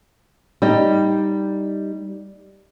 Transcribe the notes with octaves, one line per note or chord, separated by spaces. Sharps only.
G3 D#4